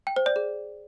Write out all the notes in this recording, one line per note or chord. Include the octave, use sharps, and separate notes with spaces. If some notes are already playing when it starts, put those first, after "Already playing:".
G5
C5
D5
G#4